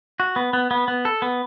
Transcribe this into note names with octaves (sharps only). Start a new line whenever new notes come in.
F#4
B3
B3
B3
B3
A4
B3